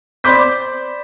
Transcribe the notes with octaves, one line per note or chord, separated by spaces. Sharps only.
C5 D5 B5 D6 G6 B6